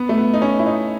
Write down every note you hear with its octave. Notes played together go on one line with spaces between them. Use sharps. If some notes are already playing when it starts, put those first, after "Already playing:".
Already playing: B3
A3
B3
D#4
C#4
E4
D#4